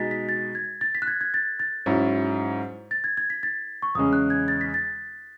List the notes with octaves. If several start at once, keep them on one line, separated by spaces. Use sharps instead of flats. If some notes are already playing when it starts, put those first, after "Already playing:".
Already playing: B2 G#3 D#4 A6 B6
B6
A6
G#6
A6
B6
F#6
G#6
G#6
A6
A6
G#2 F#3 C#4 E4
A6
G#6
G#6
B6
A6
C#6
E2 C#3 G#3 C#4 D#6
F#6
G#6
A6
B6
A6